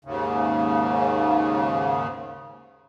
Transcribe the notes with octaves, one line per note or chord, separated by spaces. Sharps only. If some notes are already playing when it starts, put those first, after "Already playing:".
D#2 G#2 C#3